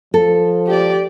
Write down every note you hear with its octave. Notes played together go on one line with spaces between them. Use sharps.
F3 A4
G4 D5